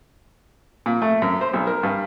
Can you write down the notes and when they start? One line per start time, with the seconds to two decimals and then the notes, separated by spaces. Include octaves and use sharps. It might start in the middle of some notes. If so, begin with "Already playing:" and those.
0.86 A#2
1.02 A3
1.22 F#2
1.41 C5
1.53 B1
1.67 A#4
1.83 G2